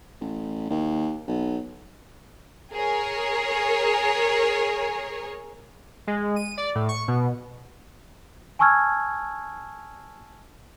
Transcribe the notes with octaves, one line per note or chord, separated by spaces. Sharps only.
A1
D#2
B1
G#4 A#4 C#5
G#3
D#7
D5
A2
C#6
B2
G#5 A5 C#6 E6 F6 G#6